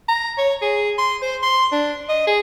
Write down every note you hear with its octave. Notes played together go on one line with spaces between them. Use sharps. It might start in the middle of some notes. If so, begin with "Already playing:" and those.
A#5
C#5
G#4
C6
C5
C6
D4
D#5
G#4